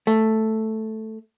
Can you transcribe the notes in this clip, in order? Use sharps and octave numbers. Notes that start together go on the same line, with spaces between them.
A3